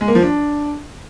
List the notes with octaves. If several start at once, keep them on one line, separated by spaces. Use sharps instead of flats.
G#3
A#3
F3
D4